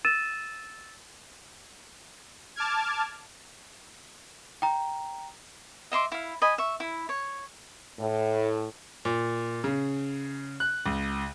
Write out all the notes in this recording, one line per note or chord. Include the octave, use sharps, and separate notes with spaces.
E6 A6 D#7 E7
A5 D6 F6 G#6
G5 A#5
D#5 E5 C6 D6
E4 F5
D#5 G#5 B5
E5 C#6
E4
C#5
A2
A#2
C#3
F#6
C#2